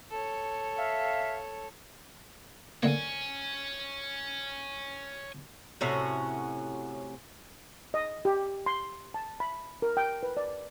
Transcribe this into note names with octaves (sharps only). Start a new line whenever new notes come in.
A4 C#5
E5 F5
D3 A#3 C#5 G#5
A2 C3 C#4 F#4
D#5
G4
C6
A5
B5
A#4
G5
B4
D5